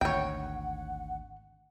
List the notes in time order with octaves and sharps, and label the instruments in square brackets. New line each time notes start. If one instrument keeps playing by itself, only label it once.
[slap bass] G#1 D2 [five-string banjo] C#5 G5 [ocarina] F#5